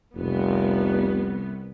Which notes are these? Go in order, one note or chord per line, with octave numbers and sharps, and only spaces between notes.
F1 C2 B3